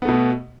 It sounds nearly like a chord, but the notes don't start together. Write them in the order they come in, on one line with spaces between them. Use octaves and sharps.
B3 A3 B2